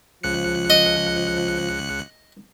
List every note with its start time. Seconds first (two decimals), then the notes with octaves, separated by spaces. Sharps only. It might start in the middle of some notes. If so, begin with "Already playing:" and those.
0.23 C#2 F3 F#6 C#7
0.70 D#5